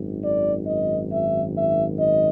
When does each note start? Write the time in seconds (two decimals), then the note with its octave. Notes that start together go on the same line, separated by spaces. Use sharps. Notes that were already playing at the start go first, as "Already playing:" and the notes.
Already playing: G#1 F#2 D#3
0.21 D5
0.65 D#5
1.09 E5
1.53 E5
1.97 D#5